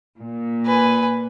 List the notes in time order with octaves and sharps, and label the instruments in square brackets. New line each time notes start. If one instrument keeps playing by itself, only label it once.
[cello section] A#2
[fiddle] B4 G#5